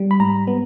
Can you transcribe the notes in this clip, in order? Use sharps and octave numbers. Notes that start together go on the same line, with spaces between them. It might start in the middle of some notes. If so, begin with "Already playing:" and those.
Already playing: G3
B5
G#2 A#5
B3